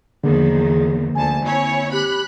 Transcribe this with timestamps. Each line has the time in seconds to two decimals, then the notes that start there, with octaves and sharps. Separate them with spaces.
0.24 E2 D3 D#3 F3 A#3 G#4
1.15 D2 G#5 A5
1.46 C4 E4 C#5
1.92 G4 B5 F#6